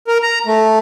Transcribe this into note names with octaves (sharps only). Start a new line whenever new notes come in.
A#4
A#5
A3